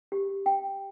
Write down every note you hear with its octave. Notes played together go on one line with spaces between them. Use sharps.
G4
G5